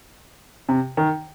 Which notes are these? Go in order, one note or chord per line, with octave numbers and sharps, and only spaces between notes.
C3
D#3